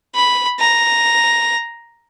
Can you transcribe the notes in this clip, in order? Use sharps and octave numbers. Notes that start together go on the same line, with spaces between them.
B5
A#5